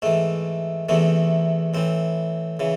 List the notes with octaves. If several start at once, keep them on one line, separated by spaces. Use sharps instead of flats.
G#2 E3 A3
E2 C3 E3 A3
A2 E3 C4
C#3 E3